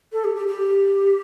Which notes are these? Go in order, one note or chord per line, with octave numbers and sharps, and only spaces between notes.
A4
G4
G4
G4